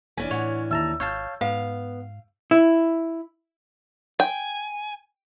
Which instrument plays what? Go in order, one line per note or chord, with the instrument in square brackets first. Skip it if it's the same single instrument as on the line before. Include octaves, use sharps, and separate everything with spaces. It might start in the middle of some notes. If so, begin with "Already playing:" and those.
[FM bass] F1 [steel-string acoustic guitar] E3 C#4 D4 [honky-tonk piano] G#5
[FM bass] A2 [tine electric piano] C#5 [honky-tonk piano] F#5 F7
[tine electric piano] D#2 A5 A#5 [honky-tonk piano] E4 E6
[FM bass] G#1 [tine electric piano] C#5 F5 A5 [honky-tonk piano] G6
[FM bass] G#2 [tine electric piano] B3 [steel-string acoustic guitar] F5
[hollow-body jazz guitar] E4
[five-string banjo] G5 [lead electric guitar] G#5